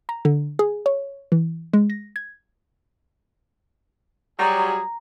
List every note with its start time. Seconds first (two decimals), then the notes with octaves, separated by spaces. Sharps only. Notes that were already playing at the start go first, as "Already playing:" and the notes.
0.09 A#5
0.25 D3
0.59 G#4
0.86 C#5
1.32 E3
1.73 G#3
1.90 A#6
2.16 G#6
4.39 F#3 G3 G#4 A#5